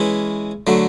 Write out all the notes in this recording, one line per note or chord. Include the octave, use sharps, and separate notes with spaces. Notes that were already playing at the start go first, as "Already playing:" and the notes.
Already playing: E3 G#3 C#4 E4
D3 F#3 A3